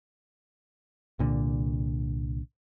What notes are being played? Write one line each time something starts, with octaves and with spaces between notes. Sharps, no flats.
C2 A#2 D3